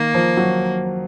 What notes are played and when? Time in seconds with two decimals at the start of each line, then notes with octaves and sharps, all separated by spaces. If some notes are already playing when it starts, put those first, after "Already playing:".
Already playing: D#3 A#3
0.15 F3
0.37 F#3